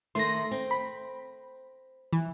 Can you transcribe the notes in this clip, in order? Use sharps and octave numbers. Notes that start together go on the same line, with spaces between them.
D#3 A3 C6 A#6
C4
B5
E3